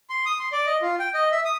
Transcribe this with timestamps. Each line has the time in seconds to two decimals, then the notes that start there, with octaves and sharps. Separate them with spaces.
0.10 C6
0.26 D#6
0.39 C6
0.52 D5
0.66 D#5
0.82 F4
1.00 G5
1.14 D#5
1.32 E5
1.45 D#6